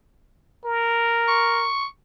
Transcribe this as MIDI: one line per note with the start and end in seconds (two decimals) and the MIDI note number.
0.65 1.68 70
1.28 1.85 85